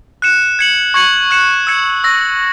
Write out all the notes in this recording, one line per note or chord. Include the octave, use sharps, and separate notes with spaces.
F#6 C#7 E7
G#6 C#7 F#7
C#6 G#6 C#7 F#7
F#6 C#7 E7
E6 G#6 C#7
C#6 E6 A#6